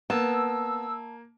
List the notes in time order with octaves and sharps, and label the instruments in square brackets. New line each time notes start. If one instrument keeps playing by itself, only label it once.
[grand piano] A#3 [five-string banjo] B3 [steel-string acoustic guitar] A5 [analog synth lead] E6